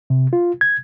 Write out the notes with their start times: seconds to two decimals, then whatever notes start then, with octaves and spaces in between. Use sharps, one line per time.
0.10 C3
0.33 F4
0.61 G#6